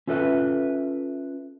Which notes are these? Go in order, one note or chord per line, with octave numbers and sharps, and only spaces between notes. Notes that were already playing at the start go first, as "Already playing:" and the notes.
C#4 F4 A4 B4 E5